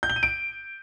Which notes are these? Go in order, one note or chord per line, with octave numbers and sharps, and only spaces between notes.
G6
G7
D#7
D7